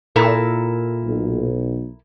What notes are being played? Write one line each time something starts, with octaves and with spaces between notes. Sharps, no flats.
A#2 E4 A4 A#4
B1